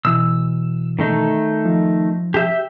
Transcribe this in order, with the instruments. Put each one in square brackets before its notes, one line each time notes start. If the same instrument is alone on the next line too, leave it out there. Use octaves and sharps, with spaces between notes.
[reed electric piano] B2 E3 [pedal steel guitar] E6
[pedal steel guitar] D#3 A3 D#4
[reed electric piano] F3
[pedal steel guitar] G4 E5 G5